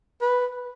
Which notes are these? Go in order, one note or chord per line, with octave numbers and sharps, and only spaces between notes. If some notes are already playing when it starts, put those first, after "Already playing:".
B4